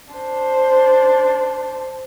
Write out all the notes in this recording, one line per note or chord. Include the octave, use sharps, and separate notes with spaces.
D4 C5